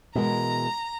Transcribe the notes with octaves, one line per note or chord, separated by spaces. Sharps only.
B2 E3 G#3 A#4 A#5